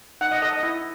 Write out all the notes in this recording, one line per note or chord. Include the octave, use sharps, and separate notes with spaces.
D#4 F#5
D#5
A4 D#5
D#5
E4